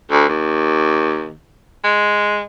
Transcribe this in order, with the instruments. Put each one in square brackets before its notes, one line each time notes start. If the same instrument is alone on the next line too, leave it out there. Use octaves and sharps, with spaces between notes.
[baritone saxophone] D2
D#2
G#3